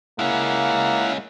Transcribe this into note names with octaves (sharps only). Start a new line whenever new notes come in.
G#3 A#3 C#4 E4 F5 F#5